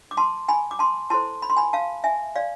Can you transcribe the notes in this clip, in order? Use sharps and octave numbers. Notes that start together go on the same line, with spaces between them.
D6
A5 C6
G#5 B5
D6
A5 C6
E4 A4 C5 A5 C6
B5
C6
G#5 B5
F5 A5
E5 G#5
D5 F5